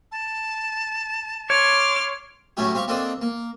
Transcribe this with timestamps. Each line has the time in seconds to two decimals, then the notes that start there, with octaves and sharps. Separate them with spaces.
0.12 A5
1.50 C#5 C6 D6 F6
2.57 A2 F#3 A3 C#4 E4 G4
2.74 C4 G4 F5 C#6
2.88 A#3 C4 D4 A4 D5 D#5
3.22 A#3